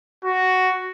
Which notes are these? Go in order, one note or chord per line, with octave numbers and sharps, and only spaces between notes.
F#4